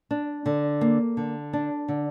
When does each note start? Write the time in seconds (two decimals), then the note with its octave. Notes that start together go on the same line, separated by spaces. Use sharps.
0.11 D4
0.46 D3
0.81 A#3
1.17 D3
1.53 D4
1.88 D3